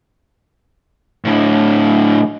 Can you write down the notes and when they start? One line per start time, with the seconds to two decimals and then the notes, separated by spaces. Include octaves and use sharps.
1.25 A2 D3